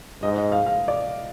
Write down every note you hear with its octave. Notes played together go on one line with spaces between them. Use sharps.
G#2 D#5
D#5
F5
F5
D5